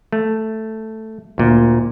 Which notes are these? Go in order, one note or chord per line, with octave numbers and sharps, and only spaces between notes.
A3
D2 A#2